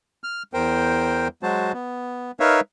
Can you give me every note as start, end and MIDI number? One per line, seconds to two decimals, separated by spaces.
0.24 0.43 89
0.54 1.28 40
0.54 1.28 70
0.54 1.28 72
0.54 1.28 79
1.43 1.72 54
1.43 1.72 56
1.43 1.72 66
1.43 1.72 72
1.43 1.72 81
1.73 2.31 59
2.40 2.60 63
2.40 2.60 70
2.40 2.60 71
2.40 2.60 73
2.40 2.60 76
2.40 2.60 77